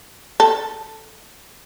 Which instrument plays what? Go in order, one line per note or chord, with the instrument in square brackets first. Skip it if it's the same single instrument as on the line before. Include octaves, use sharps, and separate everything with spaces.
[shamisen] A4